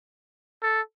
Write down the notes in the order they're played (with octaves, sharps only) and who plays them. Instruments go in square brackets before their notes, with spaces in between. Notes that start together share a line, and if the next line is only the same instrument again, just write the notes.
[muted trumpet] A4